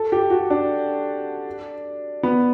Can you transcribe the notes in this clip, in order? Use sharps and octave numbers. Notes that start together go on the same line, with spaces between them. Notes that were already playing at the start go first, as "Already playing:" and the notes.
Already playing: A4
G4
F#4
D4
B3